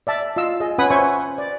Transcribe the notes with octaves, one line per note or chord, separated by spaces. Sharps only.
D5 E5 A5
F4 D#5 F5 E6
G#4 D#5
C#4 B4 F#5 G#5 B5 D#6
C5 C#5 E5 G#5 C#6
D5